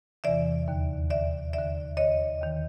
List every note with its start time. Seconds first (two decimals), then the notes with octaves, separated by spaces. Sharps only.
0.24 E2 C3 E3 D5 E5
0.68 D#2 D3
1.10 D#2 D3 D5 E5
1.53 D#2 D3 D5 E5
1.97 D#2 D3 C#5 D#5
2.41 D#2 D#3